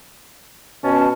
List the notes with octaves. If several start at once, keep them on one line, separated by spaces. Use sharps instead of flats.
B2 C#4 A5